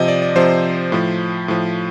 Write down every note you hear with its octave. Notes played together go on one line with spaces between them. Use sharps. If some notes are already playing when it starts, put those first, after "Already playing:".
Already playing: C3 F3 D#5
D5
D5
C3 F3 C5
A2 F3
A2 F3